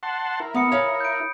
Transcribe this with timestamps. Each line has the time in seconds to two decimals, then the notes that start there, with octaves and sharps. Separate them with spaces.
0.03 F#5 A5 C6
0.40 E4 A#4
0.54 B3 B5 D#6 C#7
0.72 C#5 F5
1.00 G6 D7